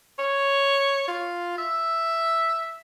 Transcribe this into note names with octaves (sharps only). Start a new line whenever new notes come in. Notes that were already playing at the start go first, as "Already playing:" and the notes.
C#5
F4
E5